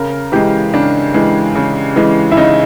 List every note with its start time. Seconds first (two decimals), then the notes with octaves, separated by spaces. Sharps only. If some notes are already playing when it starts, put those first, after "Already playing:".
Already playing: C#3 A#4
0.32 E3 G#3 G4
0.74 C#3 D4
1.14 E3 G#3
1.56 C#3
1.96 E3 G#3
2.31 E4
2.37 C#3 D#4